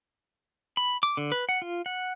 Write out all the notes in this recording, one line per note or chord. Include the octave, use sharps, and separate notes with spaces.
B5
D6
D3
B4
F#5
F4
F#5